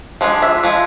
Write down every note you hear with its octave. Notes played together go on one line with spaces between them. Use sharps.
F3 G#3 D4
E5
F3 G#3